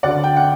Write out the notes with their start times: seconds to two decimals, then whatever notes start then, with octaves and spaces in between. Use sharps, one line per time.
0.03 D2 D3 D5 F#5
0.24 G5
0.36 F#5